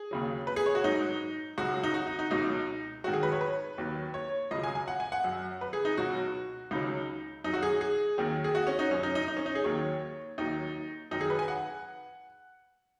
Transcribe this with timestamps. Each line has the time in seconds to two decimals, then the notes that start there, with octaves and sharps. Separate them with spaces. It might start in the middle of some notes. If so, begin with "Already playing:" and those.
Already playing: G#4
0.11 D#2 C#3 F#3
0.47 B4
0.56 G#4
0.66 C#5
0.75 F#4
0.84 G#2 F#3 D#4
1.58 C#2 C#3 F#3 F#4
1.83 D#4
1.94 F#4
2.07 D#4
2.19 D#4
2.31 C#2 B2 F#3 D#4
3.04 G#2 D#3 F#3 F#4
3.13 G#4
3.23 B4
3.32 C#5
3.41 B4
3.78 D#2 D#3 F#3
4.14 C#5
4.51 C#2 C#3 F#3 D#5
4.64 G#5
4.75 G#5
4.88 F#5
5.00 G#5
5.12 F#5
5.24 F#2 F#3
5.61 B4
5.73 G#4
5.85 D#4
5.97 C#2 B2 F#3 F#4
6.71 C#2 C#3 F#3 D#4
7.44 F#2 D#4
7.48 F#3
7.53 F#4
7.62 G#4
7.81 G#4
8.18 D#2 D#3 F#3
8.44 G#4
8.55 F#4
8.67 C#4
8.79 D#4
8.91 F#2 C#4
8.95 F#3
9.03 D#4
9.15 D#4
9.28 D#4
9.37 C#4
9.46 D#4
9.55 G#4
9.64 D#2 D#3 F#3 C#5
10.38 D#2 D#3 F#3 D#4
11.11 F#2 D#3 F#3 D#4
11.21 G#4
11.30 B4
11.39 G#5
11.48 F#5